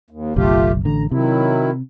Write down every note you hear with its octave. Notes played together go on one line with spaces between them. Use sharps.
D#2
F#1 B1 A3 F4 G4
A1 D3 A#5
C3 D#3 F#3 E4